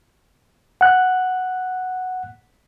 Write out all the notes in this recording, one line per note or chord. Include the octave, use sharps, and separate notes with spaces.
F#5 F#6